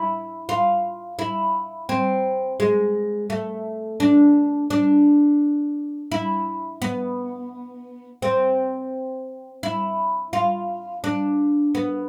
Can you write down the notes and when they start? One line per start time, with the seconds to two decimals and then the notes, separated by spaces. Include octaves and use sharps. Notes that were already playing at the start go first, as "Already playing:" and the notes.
Already playing: E4
0.49 F4
1.19 E4
1.89 C4
2.60 G#3
3.30 A3
4.00 D4
4.70 D4
6.12 E4
6.82 B3
8.22 C4
9.63 E4
10.33 F4
11.04 D4
11.75 B3